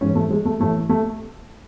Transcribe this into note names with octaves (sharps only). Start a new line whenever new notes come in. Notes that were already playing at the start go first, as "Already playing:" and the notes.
G#2 E3 C#4
A3
G#3
A3
A2 E3 A3
A3